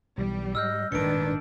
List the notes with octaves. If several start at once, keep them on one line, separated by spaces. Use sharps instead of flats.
B1 E3 G3
G#2 D#5 E6 F6 G6
G#1 G2 A#2 D#3 D4 B4 C#7 D7